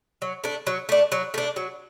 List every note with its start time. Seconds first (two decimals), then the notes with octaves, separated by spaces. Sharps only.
0.22 F#3
0.44 A3 D4
0.67 F#3
0.89 A3 D4
1.12 F#3
1.34 A3 D4
1.56 F#3